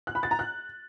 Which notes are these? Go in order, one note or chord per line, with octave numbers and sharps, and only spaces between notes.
F#6
B5
A6
A#5
F#6